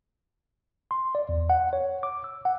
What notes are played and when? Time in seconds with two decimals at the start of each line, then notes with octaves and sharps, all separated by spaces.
0.91 C6
1.15 D5
1.29 E2
1.50 F#5
1.73 C#5
2.03 D6
2.24 E6
2.45 F#5